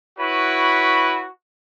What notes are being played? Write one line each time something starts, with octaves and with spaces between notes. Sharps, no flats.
E4 F#4 B4 C#5 B5